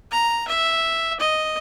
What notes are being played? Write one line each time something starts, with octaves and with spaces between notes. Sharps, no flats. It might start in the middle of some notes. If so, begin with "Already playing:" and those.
A#5
E5
D#5